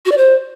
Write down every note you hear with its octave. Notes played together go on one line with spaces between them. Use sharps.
F#4
D5
C5